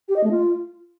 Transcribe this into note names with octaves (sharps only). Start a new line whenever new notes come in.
G4
D#5
A3
F4